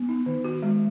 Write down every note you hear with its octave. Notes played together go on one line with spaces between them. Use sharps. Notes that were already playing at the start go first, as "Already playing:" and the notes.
Already playing: B3
D#4
D#3
F#4
G#3